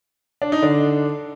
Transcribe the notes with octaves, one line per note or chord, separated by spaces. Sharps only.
D4
D#4
D3 D4